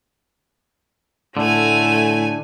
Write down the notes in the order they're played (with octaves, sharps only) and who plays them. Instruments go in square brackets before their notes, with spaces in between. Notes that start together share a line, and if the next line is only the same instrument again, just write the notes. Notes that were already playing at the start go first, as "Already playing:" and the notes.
[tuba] A2 [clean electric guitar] D3 [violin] A3 G#5